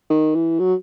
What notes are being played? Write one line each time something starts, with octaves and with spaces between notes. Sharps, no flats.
D#3
E3
F#3